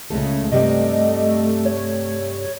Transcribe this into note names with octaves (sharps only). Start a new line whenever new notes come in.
C#2 C#3 G#3 A3 A4
G2 C3 G3 A3 D#5
C#5